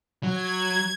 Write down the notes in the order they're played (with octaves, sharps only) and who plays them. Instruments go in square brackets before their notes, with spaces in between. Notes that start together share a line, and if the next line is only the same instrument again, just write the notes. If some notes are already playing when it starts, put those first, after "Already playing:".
[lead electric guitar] F#3 [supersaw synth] G#6